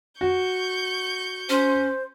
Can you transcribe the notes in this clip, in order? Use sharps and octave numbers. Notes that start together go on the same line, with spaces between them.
F#4 C#6 G6
C#4 C5